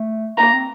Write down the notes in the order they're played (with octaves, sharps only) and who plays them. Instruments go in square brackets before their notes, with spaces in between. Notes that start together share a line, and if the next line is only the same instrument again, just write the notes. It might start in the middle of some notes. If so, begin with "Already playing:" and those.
Already playing: [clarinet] A3
[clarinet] A#3 [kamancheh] A#5
[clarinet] C4